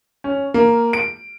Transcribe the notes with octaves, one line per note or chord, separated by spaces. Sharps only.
C#4
A#3
D7